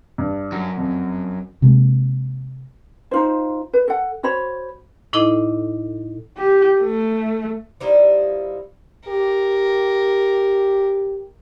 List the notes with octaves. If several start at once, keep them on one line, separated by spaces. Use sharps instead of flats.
G2
F#2
F2
C3 G#3 A#3
D#4 F4 C5
B4
A4 F#5
F#4 C5 C#5 B5
A2 D#4 E4 A4 D#5 D6
G4
A3
F3 G3 D#4 E4
G4 A#4